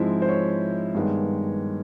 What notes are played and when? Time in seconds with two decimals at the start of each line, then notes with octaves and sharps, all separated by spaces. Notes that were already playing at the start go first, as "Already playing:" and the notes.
Already playing: G#2 F3 G#3 C4 E4 E5
0.22 C5
0.29 C#5
0.95 G2 D#3 G#3 B3